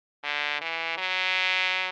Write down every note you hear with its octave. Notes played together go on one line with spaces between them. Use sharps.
D3
E3
F#3